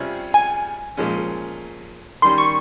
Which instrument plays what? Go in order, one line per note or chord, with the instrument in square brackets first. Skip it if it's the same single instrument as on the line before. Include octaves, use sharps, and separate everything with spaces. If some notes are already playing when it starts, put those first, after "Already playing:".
Already playing: [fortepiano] C3 G3 C#4 F4 G#4
[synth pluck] G#5
[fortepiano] A#2 F3 G#3 C#4
[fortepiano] D#3 G3 C#4 [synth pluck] C6
[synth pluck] C#6